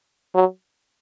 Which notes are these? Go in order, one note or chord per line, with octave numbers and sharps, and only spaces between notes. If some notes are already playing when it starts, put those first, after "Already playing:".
F#3